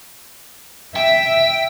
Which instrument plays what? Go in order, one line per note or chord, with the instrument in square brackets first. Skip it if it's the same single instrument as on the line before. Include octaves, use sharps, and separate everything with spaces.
[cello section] E5 [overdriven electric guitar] G5